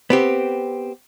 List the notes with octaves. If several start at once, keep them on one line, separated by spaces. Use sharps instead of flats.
B3 C4 G4